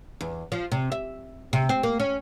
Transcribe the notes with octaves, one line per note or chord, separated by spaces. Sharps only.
E2
F3
C3
E5
C3
C4
A#3
C#4